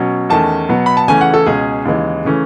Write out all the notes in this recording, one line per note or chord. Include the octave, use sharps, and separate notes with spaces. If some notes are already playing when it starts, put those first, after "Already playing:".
Already playing: B2 F#3 C#4
E2 D#3 A3 C#4 A5
B2 F#3 B3
B5
A5
E2 C#3 E3 A3 C#4 G#5
F#5
A4
C#2 B2 G#3 C#4 G#4
D#2 C#3 E3 G#3
C#3 E3 A3 C#4